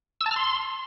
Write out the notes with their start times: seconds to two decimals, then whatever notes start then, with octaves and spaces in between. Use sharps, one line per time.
0.21 E6
0.26 A5
0.31 F6
0.36 C6